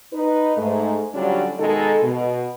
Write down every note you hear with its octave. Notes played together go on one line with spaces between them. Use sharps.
D#4 B4
G#2 A3
D3 F#3 G3 C#4 D4 F4
B2 D#3 G#3 D#4 A4
B2